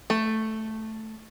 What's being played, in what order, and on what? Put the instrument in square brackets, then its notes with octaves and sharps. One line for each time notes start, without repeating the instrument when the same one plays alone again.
[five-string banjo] A3